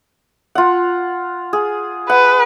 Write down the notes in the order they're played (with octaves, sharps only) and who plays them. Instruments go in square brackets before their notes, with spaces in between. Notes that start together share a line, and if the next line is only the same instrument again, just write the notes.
[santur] F4 F#5
G#4
[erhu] B4 [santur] F#5